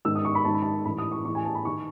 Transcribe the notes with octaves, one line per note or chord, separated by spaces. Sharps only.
G#2 D#3 E6
D#6
C#6
B5
G#2 D#3 A5
B5
A5
A2 E3 B5
D#6
C#6
A2 E3 C#6
G#5
A5
B5
D#3 C#6